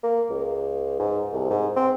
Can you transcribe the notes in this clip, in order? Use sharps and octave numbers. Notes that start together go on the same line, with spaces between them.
A#3
C#2
G#2
C2
G#2
C4